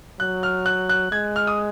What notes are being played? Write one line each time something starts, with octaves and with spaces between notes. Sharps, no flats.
F#3 F#6
F6
F#6
F#6
G#3 G#6
F6
D#6